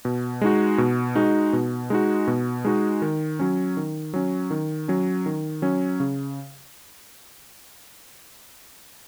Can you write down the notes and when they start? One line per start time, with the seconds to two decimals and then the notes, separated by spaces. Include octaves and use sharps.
0.05 B2
0.41 G#3 D#4 F#4
0.78 B2
1.15 G#3 D#4 F#4
1.53 B2
1.90 G#3 D#4 F#4
2.27 B2
2.65 G#3 D#4 F#4
3.02 D#3
3.39 F#3 C#4
3.77 D#3
4.14 F#3 C#4
4.50 D#3
4.88 F#3 C#4
5.26 D#3
5.62 F#3 C#4
6.00 C#3